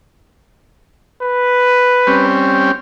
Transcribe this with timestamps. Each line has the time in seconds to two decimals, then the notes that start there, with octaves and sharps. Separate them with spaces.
1.22 B4
2.07 G3 C4 C#4